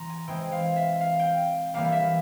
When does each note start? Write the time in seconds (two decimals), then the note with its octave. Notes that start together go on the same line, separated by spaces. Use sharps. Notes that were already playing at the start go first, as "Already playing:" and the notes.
Already playing: E3 A#5 C6
0.10 G#5
0.27 E3 G#3 C4 G5
0.52 F5
0.76 E5
1.01 F5
1.19 G5
1.74 E3 G3 A#3 F5
1.92 E5